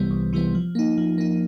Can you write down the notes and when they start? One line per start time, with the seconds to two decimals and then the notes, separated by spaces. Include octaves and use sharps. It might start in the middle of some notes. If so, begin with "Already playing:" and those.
Already playing: C2 C3 E3 G3 B3
0.11 C2
0.33 C3 E3 G3 B3
0.55 F3
0.75 A#3 D#4
0.98 F3
1.18 A#3 D#4